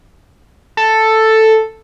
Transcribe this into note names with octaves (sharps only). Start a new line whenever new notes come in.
A4